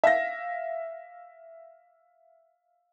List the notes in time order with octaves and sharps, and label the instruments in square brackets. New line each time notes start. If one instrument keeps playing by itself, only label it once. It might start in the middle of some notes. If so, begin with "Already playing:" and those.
[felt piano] E5 F5 A#6